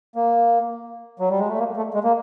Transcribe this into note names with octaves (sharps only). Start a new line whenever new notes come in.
A#3
F#3
G3
G#3
A3
A#3
A3
G#3
A#3